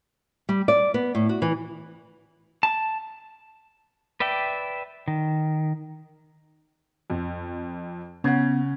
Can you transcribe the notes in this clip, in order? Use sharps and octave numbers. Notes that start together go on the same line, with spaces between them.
G3
D5
B3
A2
F#4
E3
A5
B4 D5 E5 G5
D#3
F2
C#3 B3 C#4 F#5